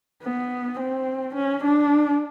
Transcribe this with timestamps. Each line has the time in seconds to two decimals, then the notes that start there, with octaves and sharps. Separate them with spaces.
0.23 B3
0.80 C4
1.35 C#4
1.64 D4